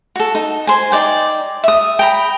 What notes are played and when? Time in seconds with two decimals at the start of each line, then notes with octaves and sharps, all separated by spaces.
0.16 F#4 A4
0.35 D#4
0.67 C5 G#5
0.92 D#4 D5 G5
1.64 E5 D#6
1.99 G5 A#5 B5